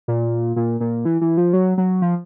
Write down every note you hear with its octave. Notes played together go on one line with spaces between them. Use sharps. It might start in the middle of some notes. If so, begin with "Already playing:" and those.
A#2
A#2
A#2
E3
E3
F3
F#3
F#3
F3